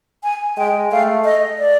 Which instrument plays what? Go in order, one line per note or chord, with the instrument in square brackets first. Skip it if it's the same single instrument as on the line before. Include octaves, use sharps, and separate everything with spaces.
[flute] G#5
[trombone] G#3 [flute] G5
[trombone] A3 [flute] F5
[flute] D#5
D5